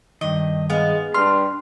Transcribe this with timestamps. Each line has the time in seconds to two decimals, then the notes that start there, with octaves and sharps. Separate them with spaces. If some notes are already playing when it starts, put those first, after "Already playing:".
0.21 G2 D#3 D#5
0.70 G#3 B3 F5
1.14 G2 D4 C6 F6